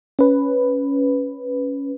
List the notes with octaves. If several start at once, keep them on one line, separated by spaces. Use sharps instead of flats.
C#4 B4